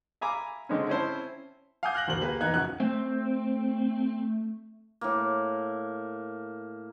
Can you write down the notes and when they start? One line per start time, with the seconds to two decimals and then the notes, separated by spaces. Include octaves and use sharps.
0.21 E5 F5 G#5 A#5 B5 D6
0.69 D3 G#3 C4 C#4
0.88 C4 C#4 E4 C5 A5
1.83 F5 F#5 G#5 D6 D#6 G6
1.95 F6 F#6 A#6 F#7
2.07 E1 D2 C5 F#7
2.21 A#3 G4 G#4 B4
2.40 F1 E2 D#4 A#5 F#6 G#6
2.54 A#1 C#3 F#4 F#6
2.80 A3 C4
5.01 A2 A#3